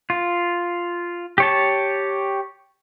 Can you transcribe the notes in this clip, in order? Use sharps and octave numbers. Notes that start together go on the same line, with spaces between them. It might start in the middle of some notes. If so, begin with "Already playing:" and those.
F4
G4 C#5 A5